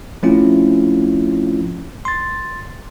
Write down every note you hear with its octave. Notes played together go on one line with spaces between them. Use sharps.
F3 A3 C4 C#4 E4 F4
C6 A6